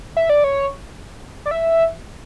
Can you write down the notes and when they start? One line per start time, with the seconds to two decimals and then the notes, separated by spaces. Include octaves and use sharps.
0.17 E5
0.30 D5
0.44 C#5
1.46 D5
1.51 E5